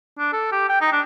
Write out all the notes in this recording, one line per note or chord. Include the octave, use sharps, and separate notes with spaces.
D4
A4
G4
G5
D#4
D4